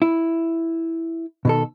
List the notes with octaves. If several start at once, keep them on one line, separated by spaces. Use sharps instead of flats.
E4
B2 D#3 A4